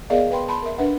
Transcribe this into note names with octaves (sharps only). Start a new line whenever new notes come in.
B3 G#4 A#4 D5 D#5 F5
B4 G5 B5 C6
A5 B5 C6
A#4 E5
D4 B4 E5 F#5